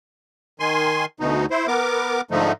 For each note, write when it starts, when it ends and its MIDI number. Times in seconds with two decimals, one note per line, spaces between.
0.60 1.05 51
0.60 1.05 80
0.60 1.05 84
1.20 1.46 38
1.20 1.46 47
1.20 1.46 63
1.51 1.67 64
1.51 1.67 72
1.68 2.21 59
1.68 2.21 70
1.68 2.21 86
2.31 2.52 44
2.31 2.52 50
2.31 2.52 53
2.31 2.52 57
2.31 2.52 63